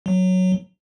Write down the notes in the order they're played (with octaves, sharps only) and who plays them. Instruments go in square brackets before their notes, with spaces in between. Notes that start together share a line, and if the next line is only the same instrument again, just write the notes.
[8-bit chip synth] F#3